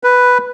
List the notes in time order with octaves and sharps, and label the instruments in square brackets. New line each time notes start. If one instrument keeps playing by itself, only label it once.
[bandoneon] B4